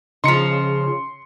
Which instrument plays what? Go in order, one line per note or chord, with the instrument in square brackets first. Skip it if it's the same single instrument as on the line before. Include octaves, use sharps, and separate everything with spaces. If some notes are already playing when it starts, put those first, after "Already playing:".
[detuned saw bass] C#3 [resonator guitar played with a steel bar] F3 D#4 [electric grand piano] C6 C#7